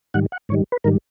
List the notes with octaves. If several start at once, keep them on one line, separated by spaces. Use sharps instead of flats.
G#2 D#3 G3 F#5
F#5
G#2 D#3 G3 C#5
B4
G#2 D#3 G3 A#4